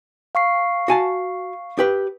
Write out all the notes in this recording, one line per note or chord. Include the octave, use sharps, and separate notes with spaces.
F5 C#6 C7
F#4 G#5 A5
G4 B4